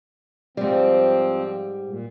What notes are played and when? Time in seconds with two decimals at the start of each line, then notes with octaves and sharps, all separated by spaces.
0.57 G#2 F3 G3 C4
1.86 A#2